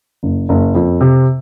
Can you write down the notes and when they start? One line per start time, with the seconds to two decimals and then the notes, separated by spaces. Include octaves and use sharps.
0.23 F#1
0.49 F#1
0.75 F2
1.01 C3